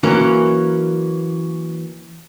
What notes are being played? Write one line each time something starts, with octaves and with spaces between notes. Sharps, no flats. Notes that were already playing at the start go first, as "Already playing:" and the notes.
E3 F#3 A#3 C#4